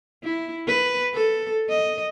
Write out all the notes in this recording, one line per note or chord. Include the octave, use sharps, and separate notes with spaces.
E4
B4
A4
D#5